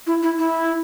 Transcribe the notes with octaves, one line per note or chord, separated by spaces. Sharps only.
E4
E4
E4